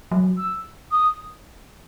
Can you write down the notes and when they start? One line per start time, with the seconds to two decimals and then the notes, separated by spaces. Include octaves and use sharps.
0.12 F#3
0.37 E6
0.91 D#6